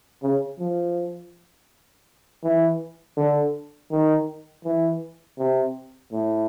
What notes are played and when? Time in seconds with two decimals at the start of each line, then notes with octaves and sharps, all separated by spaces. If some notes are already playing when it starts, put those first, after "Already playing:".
0.22 C#3
0.59 F3
2.43 E3
3.17 D3
3.91 D#3
4.65 E3
5.38 C3
6.12 A2